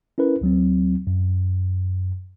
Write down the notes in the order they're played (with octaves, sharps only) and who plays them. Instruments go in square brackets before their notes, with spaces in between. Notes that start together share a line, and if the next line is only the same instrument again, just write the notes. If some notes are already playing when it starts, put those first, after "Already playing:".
[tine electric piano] C#4 E4 A#4 B4
D2 F#3 C4
F#2